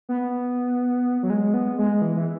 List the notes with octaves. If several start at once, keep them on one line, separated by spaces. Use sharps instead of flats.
B3
F#3
G#3
B3
G#3
E3
E3